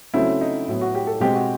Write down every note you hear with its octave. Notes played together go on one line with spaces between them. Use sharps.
C#3 F#3 A3 C4 E4
D#4
A2 F#3 B3
F#4
G4
A4
B2 G#3 C4 G4
F#4